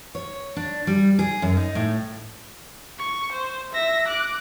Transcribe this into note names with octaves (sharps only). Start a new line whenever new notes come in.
C#5
D4
G3
G#4
F#2
D#4
A2
C#6
C5
E5 A#6
D6 F#6